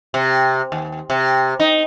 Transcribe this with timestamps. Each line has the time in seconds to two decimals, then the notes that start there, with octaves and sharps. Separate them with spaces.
0.14 C3
0.72 D#2
1.10 C3
1.60 D#4